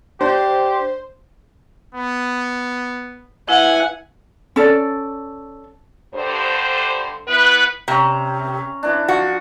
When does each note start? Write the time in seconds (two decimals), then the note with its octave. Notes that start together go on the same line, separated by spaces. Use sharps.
0.21 D4 G4 C5
1.95 B3
3.49 E4 B4 E5 F#5 G#5
4.56 C#4 A4 D5
6.14 G2 D3 C5
7.28 B3 E4 B4
7.88 C3 C#4 A#5
8.83 E3 D4
9.08 F3 F#4